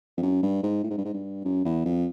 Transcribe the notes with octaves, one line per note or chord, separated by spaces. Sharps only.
F2
F#2
G2
G#2
A2
G#2
G2
G#2
G2
F#2
E2
F2